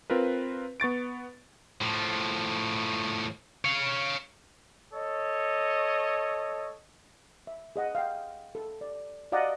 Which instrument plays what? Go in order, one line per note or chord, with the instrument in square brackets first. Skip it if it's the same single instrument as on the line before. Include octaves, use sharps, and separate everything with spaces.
[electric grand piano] C4 F4 A#4 B4
B3 C#6 A6 D7
[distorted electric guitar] A2 F3
C#5 F5
[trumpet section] A4 C#5 D#5
[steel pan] E5
G#4 D#5 F#5 D#6
F5 G5
A4
D5
F#4 D5 D#5 F5 F#5 A#5